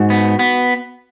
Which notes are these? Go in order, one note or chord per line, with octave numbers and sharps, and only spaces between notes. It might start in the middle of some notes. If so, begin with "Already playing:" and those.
Already playing: G#2 F#4
B3
B3